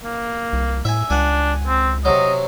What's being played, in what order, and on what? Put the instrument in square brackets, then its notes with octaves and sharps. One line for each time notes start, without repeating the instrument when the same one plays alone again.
[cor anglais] A#3
[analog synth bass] C2
[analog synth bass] A2 [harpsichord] E5 G#5
[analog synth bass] C#2 [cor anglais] D4 [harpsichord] F#5 G#5
[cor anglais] C4
[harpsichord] C3 F#3 [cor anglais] D#5